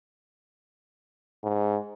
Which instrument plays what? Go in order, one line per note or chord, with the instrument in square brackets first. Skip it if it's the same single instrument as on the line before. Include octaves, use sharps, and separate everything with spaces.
[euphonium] G#2